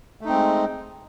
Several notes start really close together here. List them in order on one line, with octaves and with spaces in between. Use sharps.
A3 D#4 C4 G#3